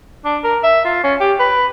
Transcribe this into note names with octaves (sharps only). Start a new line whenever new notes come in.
D4
A#4
E5
F4
C#4
G4
B4